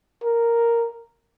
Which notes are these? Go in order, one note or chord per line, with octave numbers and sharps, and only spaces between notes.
A#4